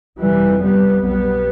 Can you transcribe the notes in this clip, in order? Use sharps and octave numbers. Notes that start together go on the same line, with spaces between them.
G1 F2 C3 E3 G3
G3 B3
B1 B2 G3 B3